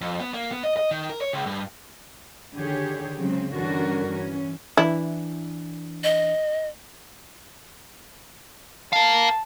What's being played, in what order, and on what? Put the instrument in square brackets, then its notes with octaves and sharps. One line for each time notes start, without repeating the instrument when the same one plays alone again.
[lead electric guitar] F2
B3
A#3
B3
D#5
D#5
D#3
A#4
C#5
C#2
G2
[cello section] D3 D#3 G4 G#4 C#5
C#3 F#3 G#3 C4
G2 D3 E3 C#4 F#4 A#4
E3 C#4
[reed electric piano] E3 D4 [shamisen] E4
[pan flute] D#5
[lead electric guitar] A#4 F5 [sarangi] A5